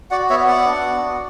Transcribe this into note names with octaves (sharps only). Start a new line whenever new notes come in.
F#4 D5 F#5
B3 C#5 E5
B3 D5 F#5
D4
F#4
B3